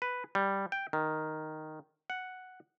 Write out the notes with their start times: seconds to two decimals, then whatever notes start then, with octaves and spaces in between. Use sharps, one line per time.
0.02 B4
0.35 G3
0.72 G5
0.93 D#3
2.10 F#5